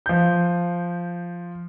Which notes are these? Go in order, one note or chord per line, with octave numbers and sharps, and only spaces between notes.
F3 G6